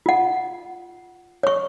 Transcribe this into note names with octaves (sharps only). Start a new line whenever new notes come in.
F4 F#5
C#5 C#6